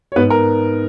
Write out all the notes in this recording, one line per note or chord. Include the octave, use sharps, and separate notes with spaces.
C#5
G#2 B3 B4
A#4